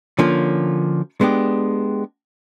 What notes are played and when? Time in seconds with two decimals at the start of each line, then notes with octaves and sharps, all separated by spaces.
0.19 D3 F3 A#3 C#4 F4
1.21 G#3 B3 D4 G4